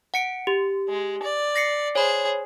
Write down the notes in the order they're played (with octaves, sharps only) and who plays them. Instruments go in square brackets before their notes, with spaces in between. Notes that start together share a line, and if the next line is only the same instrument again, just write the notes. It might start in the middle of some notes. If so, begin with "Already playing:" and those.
[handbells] F#5 C#7 D7
G4
[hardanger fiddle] G#3
D5
[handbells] A#6 C7 C#7
[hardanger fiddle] G#4 C5 [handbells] C#5 B5